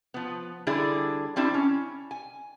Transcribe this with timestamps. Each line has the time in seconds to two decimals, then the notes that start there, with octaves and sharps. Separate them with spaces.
0.14 F3 B3
0.67 D3 G3 D4 E4 G#4
1.36 G3 C4 D4 E4
1.54 C#4
2.11 G#5